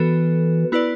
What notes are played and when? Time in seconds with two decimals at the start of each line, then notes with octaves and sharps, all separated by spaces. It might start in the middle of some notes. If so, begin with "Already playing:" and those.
Already playing: E3 B3 F#4 A4
0.72 B3 E4 B4 D5